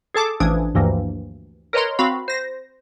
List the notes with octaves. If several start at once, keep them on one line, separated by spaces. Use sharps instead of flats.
G#4 A4 A5 D6
A1 E3 F3 D4 D#6 G#6
D2 G2 E3 F3 A#3
A#4 B4 C#5 D#5 A#5 C6
C4 F#4 F5 B5
C5 A#6